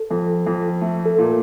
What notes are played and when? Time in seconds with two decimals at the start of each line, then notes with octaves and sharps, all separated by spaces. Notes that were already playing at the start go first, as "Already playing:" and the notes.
Already playing: A4
0.10 F2
0.46 F2
0.81 A3
1.06 A4
1.18 A#2
1.24 A#4